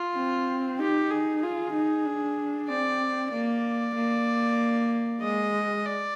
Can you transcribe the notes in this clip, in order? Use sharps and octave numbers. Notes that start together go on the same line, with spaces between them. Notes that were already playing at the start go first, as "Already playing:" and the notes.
Already playing: F4
C4
D#4 G4
G#4
F4 G#4
D#4
D4
C4 D5
A#3 D5
A#3
G#3 D#5
D5